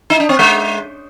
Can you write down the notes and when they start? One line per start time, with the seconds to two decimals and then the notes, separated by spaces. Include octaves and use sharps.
0.10 D#4
0.20 D4
0.29 C4
0.39 G#3